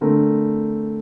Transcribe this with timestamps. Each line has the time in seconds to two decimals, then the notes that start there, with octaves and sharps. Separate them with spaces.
0.01 D3 A3 C4 A#4